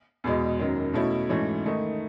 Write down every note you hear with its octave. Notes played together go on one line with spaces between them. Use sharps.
E2 B2 G#3
F#2 D#3 F#3
B2 A3 C#4 E4
G#2 E3 A3 C#4
D#3 A3 D#4